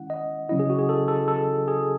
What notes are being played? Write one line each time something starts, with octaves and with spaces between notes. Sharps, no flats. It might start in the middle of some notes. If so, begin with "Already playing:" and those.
Already playing: D#3 G#3 C#4 E4 F#5
D#5
C#3 F#3 C#4 E4 D#5
G#4
F#4
G#4
A4
A4
A4
G#4